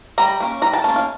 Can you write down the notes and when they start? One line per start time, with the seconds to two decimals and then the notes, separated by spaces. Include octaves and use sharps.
0.18 G3 A#5
0.40 A#3 C#4
0.62 G3 A#5
0.73 A5
0.84 A#3 C#4 A5
0.96 F5